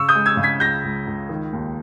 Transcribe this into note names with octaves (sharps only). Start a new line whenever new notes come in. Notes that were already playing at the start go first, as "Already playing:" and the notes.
Already playing: C#3 C#6 E6
D#6 G6
G#3
E6 G#6
C#3
G#6 B6
C#2 G6 A#6
C#2
C#2
D#3
D#2